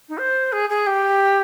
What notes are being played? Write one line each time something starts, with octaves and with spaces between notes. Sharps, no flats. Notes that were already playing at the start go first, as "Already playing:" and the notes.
D#4
C5
G#4
G#4
G4